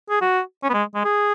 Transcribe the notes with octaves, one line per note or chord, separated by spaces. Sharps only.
G#4
F#4
C#4
B3
G#3
G#3
G#4